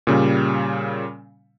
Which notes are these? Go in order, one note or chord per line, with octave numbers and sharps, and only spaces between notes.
A#2 C#3 G3